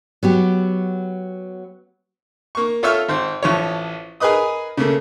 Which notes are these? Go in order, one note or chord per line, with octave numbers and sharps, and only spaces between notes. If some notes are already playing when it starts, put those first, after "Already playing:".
F#3 B3 G4
A#3 C#6
F4 A4 C#5 E5 E6 F6
G#1 C5
A1 F3 C#5
G#4 A#4 B4 D#5 D#6
C#3 A3 A#3